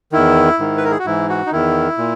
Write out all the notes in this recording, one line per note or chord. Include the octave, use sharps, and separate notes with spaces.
E2 D#3 E4
G#2 D#3
B4
A#4
G#4
F#4
G#2 E3 E4
F#4
D#4
E2 D#3 E4
A#2